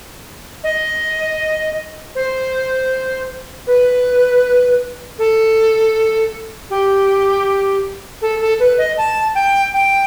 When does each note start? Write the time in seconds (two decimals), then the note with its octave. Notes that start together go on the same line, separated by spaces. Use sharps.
0.64 D#5
2.15 C5
3.67 B4
5.19 A4
6.70 G4
8.22 A4
8.40 A4
8.60 B4
8.78 D#5
8.97 A5
9.35 G5
9.73 G5